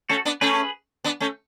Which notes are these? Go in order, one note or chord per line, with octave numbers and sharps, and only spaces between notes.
A3 C#4 F#4 A4
B3 D4
A3 C#4 G#4 B4
B3 D4
A3 C#4